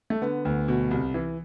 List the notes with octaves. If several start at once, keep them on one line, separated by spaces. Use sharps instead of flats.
A3
D3 B3
D2
B2
C2
E3